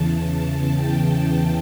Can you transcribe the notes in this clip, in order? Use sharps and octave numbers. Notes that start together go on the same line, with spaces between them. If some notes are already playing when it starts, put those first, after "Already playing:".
Already playing: E2 C#3 E3 A5
G5